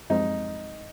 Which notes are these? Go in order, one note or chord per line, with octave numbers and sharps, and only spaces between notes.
F#2 F3 G#3 C4 D#4